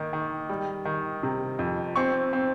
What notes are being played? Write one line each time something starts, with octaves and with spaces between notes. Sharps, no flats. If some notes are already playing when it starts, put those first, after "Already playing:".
Already playing: D#3 A#3
D#3
G3
D#3
C3
F2
C4 C#6
C4